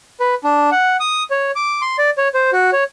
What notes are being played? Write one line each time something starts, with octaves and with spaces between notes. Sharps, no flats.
B4
D4
F#5
D#6
C#5
D6
C6
D5
C#5
C5
F#4
C#5